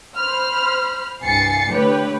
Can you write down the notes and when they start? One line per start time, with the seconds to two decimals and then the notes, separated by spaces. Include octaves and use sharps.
0.17 C5 B5 F6
1.24 C2 G2 G#5 A6 C7 C#7
1.72 D3 A3 G4 B4 C#5